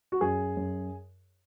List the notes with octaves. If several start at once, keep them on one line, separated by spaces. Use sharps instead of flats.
F#4
F#2 G#4
F#2